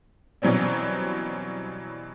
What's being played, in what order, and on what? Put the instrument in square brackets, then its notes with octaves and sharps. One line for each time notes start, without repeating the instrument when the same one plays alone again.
[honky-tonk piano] B2 E3 F#3 G3 C4 C#4